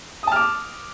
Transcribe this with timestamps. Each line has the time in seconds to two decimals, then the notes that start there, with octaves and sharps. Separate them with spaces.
0.23 D#6
0.27 A5
0.32 F6
0.36 D6